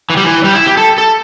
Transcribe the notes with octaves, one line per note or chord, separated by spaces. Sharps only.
E3
G3
E3
G3
E4
G4
A4
A4